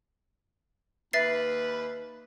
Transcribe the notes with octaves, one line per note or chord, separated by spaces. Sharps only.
D#2 B4 E5 A6 C7